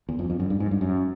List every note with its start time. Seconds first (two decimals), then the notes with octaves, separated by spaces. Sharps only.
0.09 E2
0.19 F2
0.30 F2
0.40 F#2
0.50 G2
0.60 G#2
0.71 G2
0.81 F#2